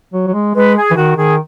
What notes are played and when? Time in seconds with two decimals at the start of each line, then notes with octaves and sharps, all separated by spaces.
0.13 F#3
0.27 F#3
0.33 G#3
0.54 G#3 B4
0.76 G#4
0.91 E3
0.96 D#3 F#4
1.16 D#3 G#4